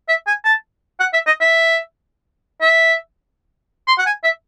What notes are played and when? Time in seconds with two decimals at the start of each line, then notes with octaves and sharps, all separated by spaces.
0.09 E5
0.27 G#5
0.45 A5
1.00 F#5
1.13 E5
1.27 D#5
1.41 E5
2.62 E5
3.88 C6
3.99 F#5
4.06 G#5
4.24 E5